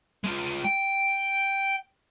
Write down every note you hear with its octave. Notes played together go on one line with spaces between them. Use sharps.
G#3 F4
G5